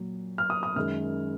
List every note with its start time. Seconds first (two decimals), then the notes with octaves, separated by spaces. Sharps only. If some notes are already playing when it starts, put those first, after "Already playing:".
Already playing: A#2 F#3
0.38 F6
0.50 D#6
0.63 D#6
0.76 F#2 D#3 G#3 F6